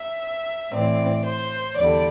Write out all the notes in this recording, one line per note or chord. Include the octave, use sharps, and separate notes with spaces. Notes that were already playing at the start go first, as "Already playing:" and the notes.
Already playing: E5
A2 E3 C4 D5
C5
E2 D3 G3 D5